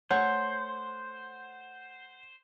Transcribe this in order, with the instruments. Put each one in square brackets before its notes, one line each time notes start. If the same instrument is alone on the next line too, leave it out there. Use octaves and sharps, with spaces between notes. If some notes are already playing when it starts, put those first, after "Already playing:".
[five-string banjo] A3 C#5 [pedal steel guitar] C5 [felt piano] F#5